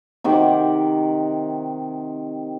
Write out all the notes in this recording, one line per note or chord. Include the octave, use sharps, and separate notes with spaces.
C3 D#3 F#5 D6